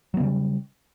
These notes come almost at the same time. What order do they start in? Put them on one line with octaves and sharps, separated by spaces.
F#3 B3 C#3 G3